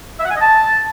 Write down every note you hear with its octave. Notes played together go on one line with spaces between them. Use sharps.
E5
F#5
G#5
D#5
A5